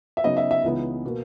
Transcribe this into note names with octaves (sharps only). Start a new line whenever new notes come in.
E5
C#3 F#3 B3 D#4 D#5
E5
E5
C#2 C#3 E3 B3 D#4
B2 A#3